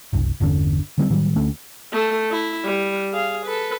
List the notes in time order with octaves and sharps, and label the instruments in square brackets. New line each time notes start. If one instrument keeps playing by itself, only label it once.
[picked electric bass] F#1 C2
G1 E2 D3 C#4
D3 G3 A#3 C4
A2 D#3 F#3 G3
D2 A3 C#4
[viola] A3 A4
E4
G3
G#4 F5
A4 B4